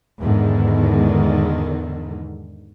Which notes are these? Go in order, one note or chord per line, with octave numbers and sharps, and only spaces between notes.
E2 G#2 D3 D#3